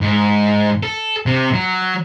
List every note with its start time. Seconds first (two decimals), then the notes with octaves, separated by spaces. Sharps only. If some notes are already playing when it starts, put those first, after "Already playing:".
0.01 G#2
0.83 A4
1.26 C3
1.54 F#3